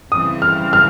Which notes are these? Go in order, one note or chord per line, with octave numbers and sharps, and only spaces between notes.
C#3 E3 G3 C4 D#6
F6
F6